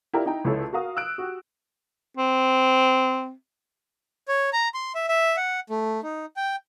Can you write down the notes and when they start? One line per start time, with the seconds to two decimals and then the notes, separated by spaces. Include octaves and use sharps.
0.13 E4 F4 G4 A#4 D5
0.26 D#4 E4 G5 A#5
0.44 C#2 E4 A4 C#5 A5
0.73 F#4 A#4 F5 D#6
0.97 E6 F#6 D7
1.18 F#4 G4
2.17 C4
4.28 C#5
4.53 A#5
4.74 C6
4.95 E5
5.09 E5
5.37 F#5
5.70 A3
6.03 D#4
6.37 G5